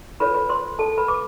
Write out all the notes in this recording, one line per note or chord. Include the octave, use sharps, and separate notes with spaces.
F4 A4 B4 C#5 B5
B4 B5
C5 C6
A4 A5
B4 B5
D6